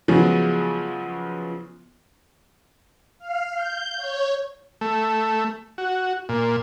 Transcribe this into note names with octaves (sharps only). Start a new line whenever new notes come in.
C#3 F3 F#3 G#3 B3 C#4
F5
G6
C#5
A3
F#4
A#2